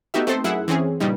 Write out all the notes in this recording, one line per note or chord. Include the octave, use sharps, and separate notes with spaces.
A3 B3 D#4 F#4 G4 E5
A3 C4 D#4 A4 C5
F#2 E4 G#4 E5 F#5
E3 C4 C#4 G#4
G2 A#2 C#3 G3 D#4